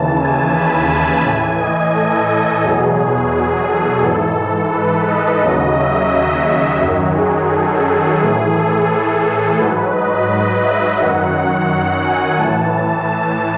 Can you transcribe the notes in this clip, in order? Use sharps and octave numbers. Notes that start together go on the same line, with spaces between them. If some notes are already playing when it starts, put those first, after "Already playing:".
Already playing: D#2 C#3 E3 A5
G#5
B5
A5
A2 E3 G#5
D#5
A4
A4
E2 B2 F#3 G#4
A4
G#2 E3 A4
A4
B4
D#5
D#2 C#3 F#3
E5
F#2 D#3 F#3
G#4
A4
A4
A2 E3 G#4
A4
A4
G#2 F#3 B4
D#5
E5
F#2 D#3 F#3 F#5
G#5
A2 E3 A5
A5